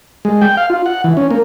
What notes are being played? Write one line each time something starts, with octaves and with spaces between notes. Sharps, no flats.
G#3
G5
F5
F4
F#5
E3
C#4
A#3